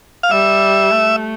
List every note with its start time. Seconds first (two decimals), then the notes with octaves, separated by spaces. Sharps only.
0.23 F5
0.31 G3 E5
0.92 A3